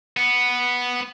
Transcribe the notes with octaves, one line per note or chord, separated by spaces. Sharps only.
B3